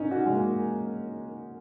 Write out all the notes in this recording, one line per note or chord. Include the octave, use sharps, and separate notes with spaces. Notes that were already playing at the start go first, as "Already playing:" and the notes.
Already playing: C#4 D#4
F#4
G#3
A#3